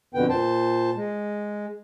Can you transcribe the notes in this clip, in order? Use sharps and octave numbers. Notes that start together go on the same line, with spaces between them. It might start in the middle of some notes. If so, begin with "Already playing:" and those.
F2 B2 D3 B3 G5
A#2 C5 A5
G#3